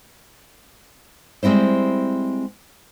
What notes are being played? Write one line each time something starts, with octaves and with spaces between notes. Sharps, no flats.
G3 G#3 C4 E4 C5